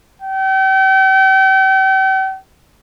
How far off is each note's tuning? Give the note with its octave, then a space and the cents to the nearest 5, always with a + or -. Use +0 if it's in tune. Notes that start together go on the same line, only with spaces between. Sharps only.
G5 -40